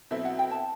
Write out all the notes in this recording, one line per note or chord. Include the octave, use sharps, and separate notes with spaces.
B2 F#3 C4 E4 A4 E5
F#5
G5
A5